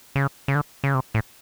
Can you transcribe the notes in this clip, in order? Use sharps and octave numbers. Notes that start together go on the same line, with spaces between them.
C#3
C#3
D3
C#3
C3
A2